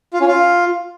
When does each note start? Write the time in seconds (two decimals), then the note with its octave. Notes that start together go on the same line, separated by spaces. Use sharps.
0.13 F4
0.21 C#4
0.28 F4